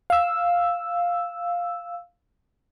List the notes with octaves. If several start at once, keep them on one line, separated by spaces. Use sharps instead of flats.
F5 E6